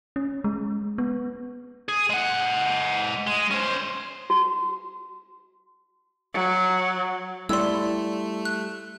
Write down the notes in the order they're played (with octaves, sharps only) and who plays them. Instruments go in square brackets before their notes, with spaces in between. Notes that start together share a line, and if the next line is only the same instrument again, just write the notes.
[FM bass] C#4
G#3
B3
[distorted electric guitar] G#4
G#3 F#5
G#3
C#4 C5
[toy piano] F#4
[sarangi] F#3
[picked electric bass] G3 [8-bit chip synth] A3 [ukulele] E4 B4 D5 [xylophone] C6 E6
[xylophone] F#6